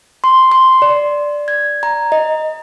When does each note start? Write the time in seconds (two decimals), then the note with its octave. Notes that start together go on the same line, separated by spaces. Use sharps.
0.24 C6
0.52 C6
0.82 D5
1.48 G#6
1.83 A#5
2.12 D#5